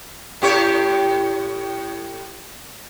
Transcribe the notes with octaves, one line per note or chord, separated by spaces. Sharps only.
A2 G4 C#5